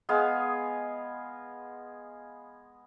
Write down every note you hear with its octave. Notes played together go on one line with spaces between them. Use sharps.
G#3 B3 G#4 F5